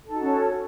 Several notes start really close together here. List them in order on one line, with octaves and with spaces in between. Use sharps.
A4 D#4 F#4 C#4